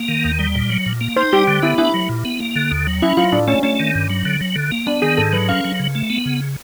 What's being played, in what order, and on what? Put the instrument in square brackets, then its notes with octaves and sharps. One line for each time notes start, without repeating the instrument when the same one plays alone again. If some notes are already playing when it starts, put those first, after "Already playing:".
Already playing: [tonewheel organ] A#3
D#3
D#2
G3
A#2
F#3
A#2
A#3
[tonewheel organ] D#4 [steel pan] C5
[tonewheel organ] G3 [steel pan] G4
[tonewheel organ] D3
[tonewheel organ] B3 [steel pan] E4
[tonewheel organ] D4 [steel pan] E4
[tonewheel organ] F#3
A#2
B3
A#3
D3
D#2
F#3
[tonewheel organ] C#4 [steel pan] E4
[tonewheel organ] F#3 [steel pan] F4
[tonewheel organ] A2 [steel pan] D4
[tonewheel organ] A3 [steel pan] C#4
[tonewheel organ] A3 [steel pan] C#4
[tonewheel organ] D#3
G2
F#3
D3
F#3
D3
A#3
[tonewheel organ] B3 [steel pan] D4
[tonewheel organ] D#3 [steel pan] G#4
[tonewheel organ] G#2 [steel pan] A4
[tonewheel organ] F#3 [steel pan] B4
[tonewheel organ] C#4 [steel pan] F5
[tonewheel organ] F#3
C#3
A3
B3
C#3